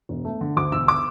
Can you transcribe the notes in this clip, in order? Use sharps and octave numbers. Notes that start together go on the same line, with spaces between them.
E1
A3
D3
D2 D6
E1 E6
D6